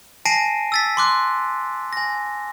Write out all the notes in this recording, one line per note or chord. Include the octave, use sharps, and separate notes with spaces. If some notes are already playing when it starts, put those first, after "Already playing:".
G#5 A5 A#6 C7 D7 D#7
E6 A6 B6
C6 D6 F#6
G#5 A#6